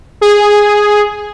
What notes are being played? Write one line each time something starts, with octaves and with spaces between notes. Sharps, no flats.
G#4